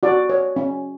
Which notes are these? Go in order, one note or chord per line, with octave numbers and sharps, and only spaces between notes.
F#4 D5
C#5
C#4